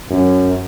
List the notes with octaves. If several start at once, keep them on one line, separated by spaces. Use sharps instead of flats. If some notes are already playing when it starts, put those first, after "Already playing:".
F#2